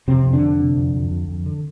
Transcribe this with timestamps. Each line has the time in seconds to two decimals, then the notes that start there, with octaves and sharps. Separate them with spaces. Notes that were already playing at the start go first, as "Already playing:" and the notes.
0.08 F2 C3 C4
0.25 F2
0.33 D3 D4
0.42 C3
0.60 C3
0.76 F2
0.94 F2
1.11 F2
1.28 F2
1.46 D3